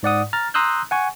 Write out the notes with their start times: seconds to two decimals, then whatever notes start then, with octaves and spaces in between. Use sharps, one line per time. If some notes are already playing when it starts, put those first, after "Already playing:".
0.03 G#2 D5 F#5 D#6
0.33 A#5 F6 A6
0.54 A#5 C6 D#6 E6 F#6 G6
0.91 F#5 G#5 C#6